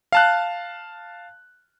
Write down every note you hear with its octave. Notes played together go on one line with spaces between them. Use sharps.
F5 A5 F#6